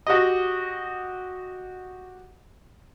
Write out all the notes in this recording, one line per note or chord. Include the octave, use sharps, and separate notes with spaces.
F#4 G4 D#5